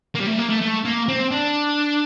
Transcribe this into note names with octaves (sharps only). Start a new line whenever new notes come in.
A#3
G3
A3
A#3
A3
A3
A#3
C4
D4